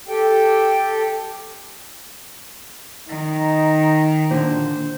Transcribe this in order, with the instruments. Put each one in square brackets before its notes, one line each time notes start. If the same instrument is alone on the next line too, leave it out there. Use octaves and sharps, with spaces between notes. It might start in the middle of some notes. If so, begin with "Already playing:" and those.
[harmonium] G4 A4 G5
[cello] D#3 [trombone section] D#4
[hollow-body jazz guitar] A#2 D3 [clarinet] C5